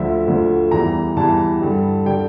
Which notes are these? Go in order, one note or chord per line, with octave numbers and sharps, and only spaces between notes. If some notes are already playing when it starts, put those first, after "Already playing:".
Already playing: D2 D3 F3 E5
D2 D3 F3
E2 E3 G3 A#5
E2 E3 G3 A5
G2 D3 G3
D3 G3 G5